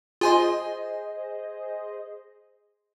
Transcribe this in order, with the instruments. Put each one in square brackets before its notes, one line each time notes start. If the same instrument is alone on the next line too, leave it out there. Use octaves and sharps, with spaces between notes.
[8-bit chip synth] F4 G#5 C6 [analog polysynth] G#4 C5 D#5